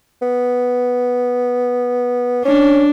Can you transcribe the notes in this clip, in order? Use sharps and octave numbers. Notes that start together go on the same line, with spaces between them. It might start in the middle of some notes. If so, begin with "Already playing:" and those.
B3
C#4 D4